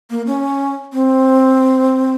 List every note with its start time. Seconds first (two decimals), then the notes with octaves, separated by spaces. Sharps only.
0.10 A#3
0.27 C#4
0.93 C4